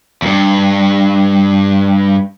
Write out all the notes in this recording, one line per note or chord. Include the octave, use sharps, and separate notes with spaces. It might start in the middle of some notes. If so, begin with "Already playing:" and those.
E2 G2